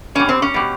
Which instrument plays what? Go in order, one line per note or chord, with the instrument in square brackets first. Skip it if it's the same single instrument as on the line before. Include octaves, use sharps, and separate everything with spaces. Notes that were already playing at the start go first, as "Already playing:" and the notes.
[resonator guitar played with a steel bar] B2 G3 C#4
C4
C#4
B2 G3